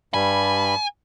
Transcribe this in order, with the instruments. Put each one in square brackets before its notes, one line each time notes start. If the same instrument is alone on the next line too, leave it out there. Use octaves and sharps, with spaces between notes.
[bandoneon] G2 G3 B5 [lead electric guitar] G#5